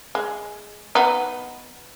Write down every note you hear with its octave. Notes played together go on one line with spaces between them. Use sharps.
G#3
B3 D#4